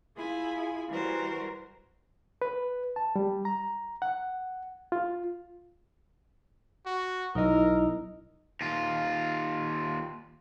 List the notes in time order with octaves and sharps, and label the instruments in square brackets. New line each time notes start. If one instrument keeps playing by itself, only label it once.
[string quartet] E4 F4 G#4 G#5 B5
E3 G3 F#4 A#4 C5
[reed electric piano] B4
A5
G3
A#5
F#5
F4
[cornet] F#4
[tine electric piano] B1 D#5 [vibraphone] D#4 E4 [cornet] A#4
[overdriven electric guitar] D#2 F4